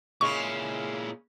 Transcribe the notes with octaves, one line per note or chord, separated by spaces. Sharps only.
A#2 C#3 G#3 C#4 E4 C#6